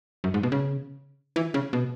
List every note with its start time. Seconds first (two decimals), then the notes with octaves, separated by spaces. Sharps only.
0.24 F#2
0.34 G#2
0.43 B2
0.52 C#3
1.36 E3
1.54 C#3
1.73 B2